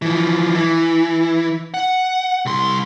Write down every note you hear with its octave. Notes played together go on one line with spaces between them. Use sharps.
E3 F3
E3
F#5
C2 C6